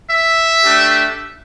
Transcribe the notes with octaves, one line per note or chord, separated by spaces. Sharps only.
E5
A3 D4 G4